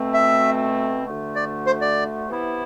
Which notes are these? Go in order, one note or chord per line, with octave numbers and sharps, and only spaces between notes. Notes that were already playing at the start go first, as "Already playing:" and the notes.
Already playing: B2 A3 C4
E5
D2 D3 A3
D5
C5
D5
C3 E3 B3 E4